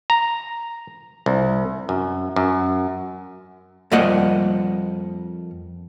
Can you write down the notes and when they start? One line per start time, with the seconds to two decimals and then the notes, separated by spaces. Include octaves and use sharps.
0.10 A#5
1.26 C2
1.89 F#2
2.36 F#2
3.92 F2 G3 A#3 D#5 F#5